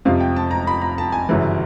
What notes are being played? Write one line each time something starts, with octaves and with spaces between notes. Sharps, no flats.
F2 C3 F3 F5
G5
A5
A#5
B5
A#5
A5
G#5
G1 F#2 C#3 E3